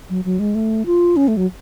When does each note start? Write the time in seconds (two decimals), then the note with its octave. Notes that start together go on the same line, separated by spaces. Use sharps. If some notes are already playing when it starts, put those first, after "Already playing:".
0.10 F#3
0.25 F#3
0.39 G#3
0.55 A3
0.86 F4
1.17 C#4
1.28 A3
1.37 F#3